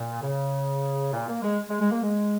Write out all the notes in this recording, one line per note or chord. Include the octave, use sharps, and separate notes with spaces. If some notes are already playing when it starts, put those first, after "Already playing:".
Already playing: A#2
C#3
A#2
A#3
G#3
G#3
G#3
A#3
G#3